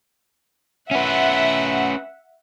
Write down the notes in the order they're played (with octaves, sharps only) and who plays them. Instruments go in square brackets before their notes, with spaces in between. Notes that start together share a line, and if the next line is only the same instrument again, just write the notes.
[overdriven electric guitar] C#4 B4 [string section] E5 F#5